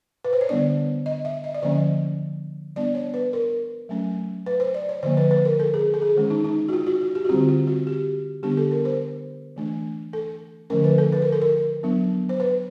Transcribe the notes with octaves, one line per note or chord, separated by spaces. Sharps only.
B4
C5
C#5
D3 G3 B3 D4 D5
D#5
E5
D#5
D5
D3 F3 A#3 C#4 D#5
G3 B3 D4 D5
C#5
B4
A#4
F#3 A3 C#4
B4
C5
D5
C#5
D3 F3 A#3 C5
B4
B4
A#4
A4
G#4
A4
G#4
D#3 G#3 C#4
D#4
D#4
F#4
F4
F#4
F#4
G4
F#4
D3 G3 C4 F4
F4
F#4
G4
D3 G3 B3 D4 G4
A4
A#4
C5
E3 A3 D4
A4
D3 F3 A3 C#4 A#4
B4
A4
B4
A#4
A4
A#4
F#3 B3 D4
C5
B4